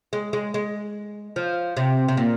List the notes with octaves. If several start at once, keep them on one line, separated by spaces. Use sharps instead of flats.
G#3
G#3
G#3
F3
C3
C3
A#2